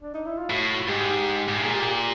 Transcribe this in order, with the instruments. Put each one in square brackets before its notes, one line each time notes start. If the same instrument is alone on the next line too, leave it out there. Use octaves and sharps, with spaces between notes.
[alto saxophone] D4
D#4
E4
F4
[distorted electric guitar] A2 [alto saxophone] F#4
[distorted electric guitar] G#2 [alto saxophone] G4
[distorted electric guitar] G#2
A2
[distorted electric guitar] A#2 [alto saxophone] G#4
[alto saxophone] G4
G4